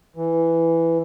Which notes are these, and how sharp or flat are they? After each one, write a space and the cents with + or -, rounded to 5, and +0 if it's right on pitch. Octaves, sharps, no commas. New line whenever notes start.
E3 +5